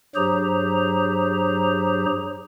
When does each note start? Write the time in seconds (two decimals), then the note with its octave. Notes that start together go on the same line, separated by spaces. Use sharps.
0.15 G2 F#3 G4 G#4 C5 A#5